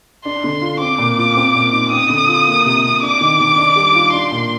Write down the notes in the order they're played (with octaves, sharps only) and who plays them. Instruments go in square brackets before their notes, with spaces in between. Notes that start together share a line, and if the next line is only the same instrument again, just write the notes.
[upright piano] D4 [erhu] C6
[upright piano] D3
F4
[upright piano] C4 [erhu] D6
[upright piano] A#2
F4
C4
A#2
D#4
[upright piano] C4 [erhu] D#6
[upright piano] D3
F4
A#3
C3
C3
[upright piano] D4 [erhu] D6
[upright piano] D#3
D#3
D4
G3
F4
[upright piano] D4 [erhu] C6
[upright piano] A#2